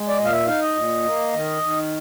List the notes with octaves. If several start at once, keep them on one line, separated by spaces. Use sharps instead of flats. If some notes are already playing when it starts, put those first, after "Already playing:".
Already playing: G#3
D5
A#2 D#5
F5
E5
D#4 F5
D#5
A#2
A#3
D#3
D#3